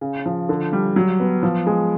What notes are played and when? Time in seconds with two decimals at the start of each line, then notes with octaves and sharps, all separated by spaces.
0.01 C#3
0.26 F3
0.49 D3
0.73 G3
0.96 F#3
1.20 B3
1.43 F3
1.67 G#3